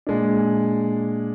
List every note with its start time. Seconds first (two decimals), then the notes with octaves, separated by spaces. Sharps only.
0.07 A#2 G#3 D4